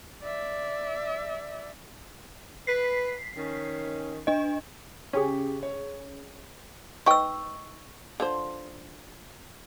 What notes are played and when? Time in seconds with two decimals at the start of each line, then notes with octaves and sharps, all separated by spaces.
0.23 D5 E5
2.67 B4 B6 C7
3.37 D#3 C#4
4.27 D4 D#5
5.13 C#3 C#4 G4 G#4 C#6
5.63 C#5
7.06 D#4 B4 G5 C#6 E6
8.20 D3 F3 C5